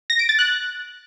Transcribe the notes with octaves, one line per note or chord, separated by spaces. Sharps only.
A#6
D7
A6
F#6